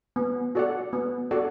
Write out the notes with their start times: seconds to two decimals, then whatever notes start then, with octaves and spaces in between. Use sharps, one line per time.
0.16 B3
0.55 F#4 A4 D5 F#5
0.93 B3
1.31 F#4 A4 D5 F#5